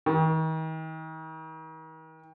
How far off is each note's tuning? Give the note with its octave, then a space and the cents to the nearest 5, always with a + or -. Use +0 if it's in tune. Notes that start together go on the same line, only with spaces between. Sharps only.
D#3 +40